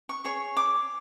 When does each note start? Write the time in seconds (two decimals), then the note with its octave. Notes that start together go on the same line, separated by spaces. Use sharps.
0.09 C#6
0.24 G#4 C#5 C#6
0.57 D6